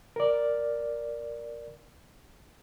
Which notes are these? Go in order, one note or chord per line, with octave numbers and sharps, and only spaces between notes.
A#4 D5